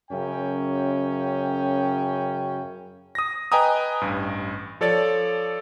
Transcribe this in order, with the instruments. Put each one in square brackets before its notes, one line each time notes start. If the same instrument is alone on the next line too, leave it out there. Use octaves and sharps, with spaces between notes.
[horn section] F#2 C#3 C#4 G5
[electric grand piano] D#6 A#6
B4 D#5 G5 G#5 A#5 D#6
A1 G2
F3 A4 C#5 D5 A6